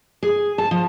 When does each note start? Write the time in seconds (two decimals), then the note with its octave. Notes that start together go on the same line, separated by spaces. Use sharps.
0.23 G#4
0.58 A5
0.71 F3